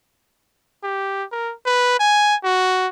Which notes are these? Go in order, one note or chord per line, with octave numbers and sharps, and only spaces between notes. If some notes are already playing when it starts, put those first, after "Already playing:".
G4
A#4
B4
G#5
F#4